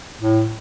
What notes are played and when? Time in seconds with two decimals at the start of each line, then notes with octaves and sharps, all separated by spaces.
0.19 A2